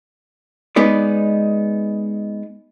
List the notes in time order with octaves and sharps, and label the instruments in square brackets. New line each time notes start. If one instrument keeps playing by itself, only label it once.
[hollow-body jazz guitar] G#3 B3 D#4 B4 D5